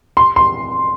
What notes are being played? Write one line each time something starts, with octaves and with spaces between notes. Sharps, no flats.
C6
C6